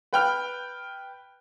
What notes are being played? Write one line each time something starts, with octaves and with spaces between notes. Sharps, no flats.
B4 G5 F6